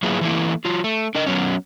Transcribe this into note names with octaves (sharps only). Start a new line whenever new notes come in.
F#3 A#3 B3 E4 F4 G#4
E3 A3 A#3 E4
F#3 F4
A3
D4 A#4 D#5
F#3 B3 C#4